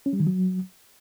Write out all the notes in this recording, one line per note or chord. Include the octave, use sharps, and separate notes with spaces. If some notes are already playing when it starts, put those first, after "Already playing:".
C#4
G3
D#3
F#3